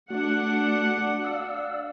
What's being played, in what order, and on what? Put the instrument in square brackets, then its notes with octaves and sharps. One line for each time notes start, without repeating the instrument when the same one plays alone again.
[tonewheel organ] A3 F#4 [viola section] D4 F#5
[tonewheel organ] D5 F5 E6